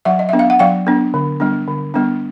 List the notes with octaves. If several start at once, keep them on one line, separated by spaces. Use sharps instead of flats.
F#3 E5 F#5
D#5
B3 D4 E5
F5
F#5
F#3 F5 G5
B3 D4
D3
G3 B3 D4
D3
G3 B3 D4